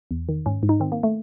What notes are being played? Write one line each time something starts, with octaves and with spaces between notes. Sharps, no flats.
E2
D#3
G#2 C#4
G#2
D#4
D#3 C4
A#3
A3